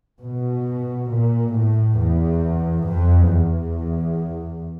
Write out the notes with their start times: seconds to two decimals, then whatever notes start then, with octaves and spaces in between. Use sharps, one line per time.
0.21 B2
1.10 A#2
1.54 A2
1.97 E2
2.86 F2
3.30 E2